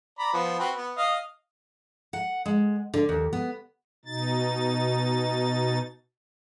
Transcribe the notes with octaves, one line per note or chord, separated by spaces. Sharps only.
D5 A#5 B5
F3 B3
C4 F#4 B4
B3
D#5 F5
F#5
G#3
D3
D#2
B3
B2 D#4 A6